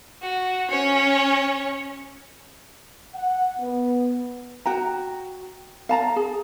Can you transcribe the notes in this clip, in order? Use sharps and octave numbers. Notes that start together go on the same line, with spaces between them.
F#4
C#4 C#5
F#5
B3
F#4 G5 A#5
F5 A5 A#5
G#4